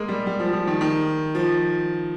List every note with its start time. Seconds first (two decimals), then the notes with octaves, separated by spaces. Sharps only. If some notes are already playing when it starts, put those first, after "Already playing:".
Already playing: G#3 A#3
0.08 G3
0.27 G3
0.40 F3
0.53 F3
0.67 D#3
0.81 D#3
1.35 F3